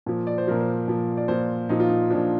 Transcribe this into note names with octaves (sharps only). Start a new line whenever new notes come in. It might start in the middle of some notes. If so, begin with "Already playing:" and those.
A#2 F3
D5
C5
A#2 F3 A#4
C5
A#2 F3
D5
A#2 F3 C5
A#2 F3 D#4
F4
D#4
A#2 F3 D4